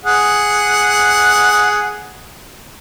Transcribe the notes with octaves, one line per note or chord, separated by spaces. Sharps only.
G#4 F#5